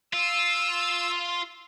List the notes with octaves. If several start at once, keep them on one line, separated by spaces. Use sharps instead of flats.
F4 E6